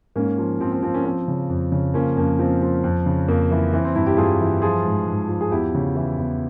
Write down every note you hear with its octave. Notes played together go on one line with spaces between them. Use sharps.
G#2 A#3 C#4
F3
F3 C4
C4
F3 C4
A#3 C#4
F3 C4
C#3
F2
C#3
F3 A#3 C#4
F2 A#3 C#4
F3 C4
F3
F2
C#3
F2 A#3
E3
E3 C4
C4
G2 C4 E4
E4 G4
G2 F4 G#4
E3
F3 F4 G#4
G#2
G#2
F3
G#4
E2 E4 G4
C#3
E3
E2